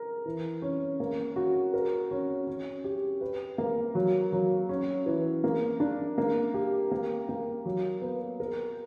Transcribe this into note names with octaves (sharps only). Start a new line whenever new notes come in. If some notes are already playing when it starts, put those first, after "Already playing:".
Already playing: A#4
E3
C#4
A#3
F#4
A#4
C#4
C#4
G4
B4
A#3
F#3
F#3
C#4
E3
A#3
D4
A#3
G4
A#3
A#3
F#3
B3
A#4